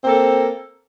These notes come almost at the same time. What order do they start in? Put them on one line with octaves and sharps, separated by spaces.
C4 A#3 A4